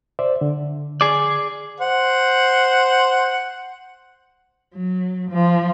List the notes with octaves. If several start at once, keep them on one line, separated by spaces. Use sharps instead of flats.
C5 D5 E5
D3
G#4 D5
C5 F#5
F#3
F3